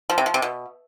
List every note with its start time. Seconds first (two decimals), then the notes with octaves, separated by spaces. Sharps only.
0.10 F3
0.18 C3
0.26 F3
0.34 C3
0.42 B2